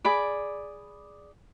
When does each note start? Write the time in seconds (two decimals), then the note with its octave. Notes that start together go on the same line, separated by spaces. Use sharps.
0.05 G#4 D5 B5 D6